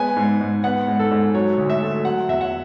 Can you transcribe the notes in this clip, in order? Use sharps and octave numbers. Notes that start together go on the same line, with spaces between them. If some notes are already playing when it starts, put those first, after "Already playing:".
Already playing: G#3 B3 G#5
G#2
G#2
B3 F#5
G#2
A4
G#2
F#3 C#5
D2
E5
A3
F#3 F#5
E2 E5
F#5